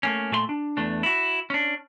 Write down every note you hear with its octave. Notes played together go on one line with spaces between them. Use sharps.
A3 A#3 C#4
A#2 A3 B4 C6
D4
E2 A3 D4
E4 F#4
C#4 D4